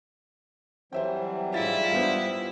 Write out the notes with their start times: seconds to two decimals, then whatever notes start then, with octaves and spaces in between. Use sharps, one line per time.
0.92 E3 F#3 G3 C4 C5 E5 G5
1.54 G#2 E4 F4 A6
1.92 G3 B3 C5